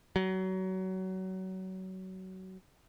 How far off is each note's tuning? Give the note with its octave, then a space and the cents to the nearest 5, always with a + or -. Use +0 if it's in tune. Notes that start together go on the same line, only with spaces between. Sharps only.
F#3 +25